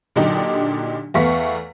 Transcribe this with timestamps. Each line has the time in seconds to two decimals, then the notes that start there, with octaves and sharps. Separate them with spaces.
0.16 A#2 D3 F#3 D4 D#4 G4
1.14 E2 A3 B3 F5 C#6 B6